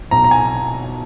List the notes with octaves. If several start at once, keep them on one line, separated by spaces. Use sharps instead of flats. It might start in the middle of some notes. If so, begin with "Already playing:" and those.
B1 A#5
A#5
G#5